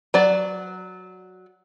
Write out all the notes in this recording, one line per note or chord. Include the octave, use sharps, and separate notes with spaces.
F#3 D5